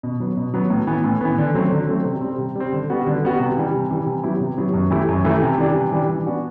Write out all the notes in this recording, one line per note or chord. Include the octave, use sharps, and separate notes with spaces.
B2
F#3 B3
B2
F#3 B3
A2
E3 B3
A2
E3 B3
D3
F#3 A3 C4
D3
F#3 A3 C4
C3
G3 C4
C3
G3 C4
D3
G3 B3 F#4
D3
G3 B3 F#4
C3
E3 G3
C3
E3 G3
C3
F#3 B3 E4 G4
C3
F#3 B3 E4 G4
F#2
E3 A3 E4 G4
F#2
E3 A3 E4 G4
C3
E3 G3 D4 G4
C3
E3 G3 D4 G4
E3
B3 D4 F#4